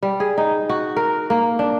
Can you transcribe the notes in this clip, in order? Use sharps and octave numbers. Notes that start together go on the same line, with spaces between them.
G3
G#4
D#4
F#4
A#4
A#3
D4